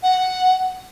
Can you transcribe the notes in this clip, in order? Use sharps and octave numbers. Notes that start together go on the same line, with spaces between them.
F#5